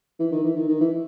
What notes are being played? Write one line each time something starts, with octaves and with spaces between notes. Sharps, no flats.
E3
D#3
E3
D#3
D#3
E3